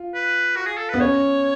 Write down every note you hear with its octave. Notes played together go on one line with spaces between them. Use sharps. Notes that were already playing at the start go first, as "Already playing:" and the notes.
Already playing: F4
B4
F#4
G#4
A4
B3 B4
C#4 C#5